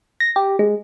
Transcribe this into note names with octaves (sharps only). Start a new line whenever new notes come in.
A#6
G4
G#3